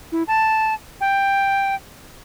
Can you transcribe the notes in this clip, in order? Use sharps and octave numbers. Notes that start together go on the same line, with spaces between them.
E4
A5
G5